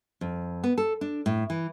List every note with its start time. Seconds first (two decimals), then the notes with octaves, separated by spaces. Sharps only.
0.21 F2
0.64 B3
0.78 A4
1.01 D4
1.26 A2
1.50 E3